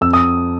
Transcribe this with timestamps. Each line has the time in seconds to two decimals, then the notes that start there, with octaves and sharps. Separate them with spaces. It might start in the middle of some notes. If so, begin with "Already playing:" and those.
0.01 F2 E6
0.13 D#6